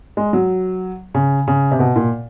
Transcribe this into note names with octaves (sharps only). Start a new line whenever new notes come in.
G#3
F#3
C#3
C#3
C3
B2
A#2